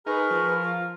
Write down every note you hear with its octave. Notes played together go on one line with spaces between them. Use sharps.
D#4 G#4 A#4 B4 C#6
F3
F4